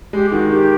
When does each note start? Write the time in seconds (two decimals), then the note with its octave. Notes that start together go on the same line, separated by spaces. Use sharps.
0.13 G#3 G4
0.32 D#3 F#4
0.50 D#3 G4